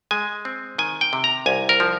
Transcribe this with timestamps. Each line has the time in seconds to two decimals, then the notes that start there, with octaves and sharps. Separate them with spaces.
0.11 G#3 G#5
0.45 C4
0.79 D#3 G#5
1.01 G5
1.13 C3
1.24 A#5
1.46 C2 G#5
1.69 A#4
1.80 F3